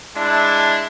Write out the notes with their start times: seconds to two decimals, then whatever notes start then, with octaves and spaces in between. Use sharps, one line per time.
0.15 G#3 D4 E4 A5